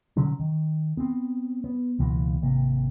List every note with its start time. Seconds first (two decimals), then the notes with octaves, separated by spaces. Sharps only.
0.17 B2 D3 F#3 C#4
0.40 D#3
0.97 B3 C4
1.64 B3
1.99 C#2 B2 E3 A#3
2.42 G#1 C3 A#3